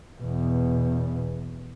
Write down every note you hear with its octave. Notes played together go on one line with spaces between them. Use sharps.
E2 B2